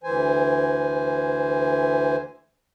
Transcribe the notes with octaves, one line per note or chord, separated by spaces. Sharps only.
D2 E3 C5 G#5